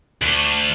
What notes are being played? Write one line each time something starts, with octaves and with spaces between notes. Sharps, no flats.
D2